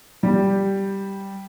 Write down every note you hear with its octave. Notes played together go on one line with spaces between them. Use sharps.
G3 G4